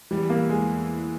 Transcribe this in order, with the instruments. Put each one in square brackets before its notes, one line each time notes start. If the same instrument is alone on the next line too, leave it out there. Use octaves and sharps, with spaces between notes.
[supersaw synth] E2 E3 [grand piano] G3
[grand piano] A#3
G#3